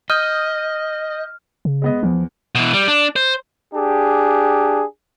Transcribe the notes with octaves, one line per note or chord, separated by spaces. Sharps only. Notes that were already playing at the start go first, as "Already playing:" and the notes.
D#5 D#6 F6 G6
C#3
G#3 B3 D#5
E2 F3
B2 E3
G3
D4
C5
D4 G4 G#4